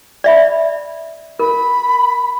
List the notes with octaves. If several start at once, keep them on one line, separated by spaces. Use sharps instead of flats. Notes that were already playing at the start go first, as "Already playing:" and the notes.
D5 E5 B5
A#4 B5